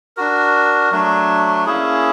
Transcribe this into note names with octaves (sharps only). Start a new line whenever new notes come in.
D4 F#4 A#4
F#3 A3 D4
A#3 C#4 E4 G#4